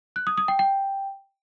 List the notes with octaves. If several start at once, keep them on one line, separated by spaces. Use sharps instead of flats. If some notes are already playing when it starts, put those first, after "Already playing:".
F#6
D#6
D#6
G5
G5